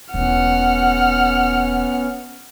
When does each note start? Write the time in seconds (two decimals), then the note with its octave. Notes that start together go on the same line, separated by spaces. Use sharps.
0.14 E1 B3 C#4 F#5 F6